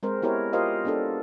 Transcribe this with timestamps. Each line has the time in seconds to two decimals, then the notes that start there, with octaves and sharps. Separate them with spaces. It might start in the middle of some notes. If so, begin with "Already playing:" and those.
0.03 G#3 C4 A#4 C5
0.22 B3 E4 G4 A#4 C#5
0.53 F4 G4 A#4 C5 D#5 F5
0.85 B3 D4 A4